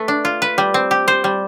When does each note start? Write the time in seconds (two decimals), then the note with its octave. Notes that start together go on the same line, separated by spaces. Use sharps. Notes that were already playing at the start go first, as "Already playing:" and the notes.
Already playing: A3 B4
0.08 D4
0.25 F4
0.42 B4
0.58 G3
0.74 C4
0.91 G4
1.08 C5
1.24 G3